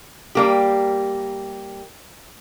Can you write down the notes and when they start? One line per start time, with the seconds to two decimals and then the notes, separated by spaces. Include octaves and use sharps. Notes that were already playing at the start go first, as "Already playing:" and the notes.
0.35 G3 A#3 G4